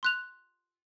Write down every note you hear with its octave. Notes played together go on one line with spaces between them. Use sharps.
C6 F#6 F7